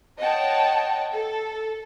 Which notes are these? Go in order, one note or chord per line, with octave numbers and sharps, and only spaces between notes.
C#5 D#5 F#5 G5 A5
A4